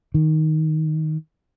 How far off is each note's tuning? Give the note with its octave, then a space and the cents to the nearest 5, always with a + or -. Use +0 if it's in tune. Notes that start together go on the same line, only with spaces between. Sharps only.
D#3 +5